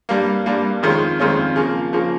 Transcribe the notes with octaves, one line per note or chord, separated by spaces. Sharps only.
G2 G3 A#3
G2 G3 A#3
F2 D#3 G#3 C#4 F4
F2 D#3 G#3 C#4 F4
C#3 F3 A#3
C#3 F3 A#3